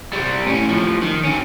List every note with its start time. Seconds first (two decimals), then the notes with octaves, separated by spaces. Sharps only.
0.13 C3 G3
0.47 A2 C#4
0.70 A2 F3
1.02 D#3
1.24 G2 C#4